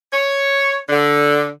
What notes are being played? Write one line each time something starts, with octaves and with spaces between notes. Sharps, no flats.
C#5
D3